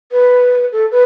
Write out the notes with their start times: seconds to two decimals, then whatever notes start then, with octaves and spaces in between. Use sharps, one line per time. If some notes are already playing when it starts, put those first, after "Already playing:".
0.12 B4
0.72 A4
0.91 B4